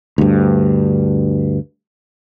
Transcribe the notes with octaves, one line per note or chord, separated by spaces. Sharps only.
D2 G2